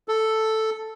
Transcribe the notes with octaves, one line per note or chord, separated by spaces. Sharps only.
A4